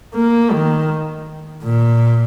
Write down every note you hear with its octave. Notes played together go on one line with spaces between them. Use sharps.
A#3
D#3
A#2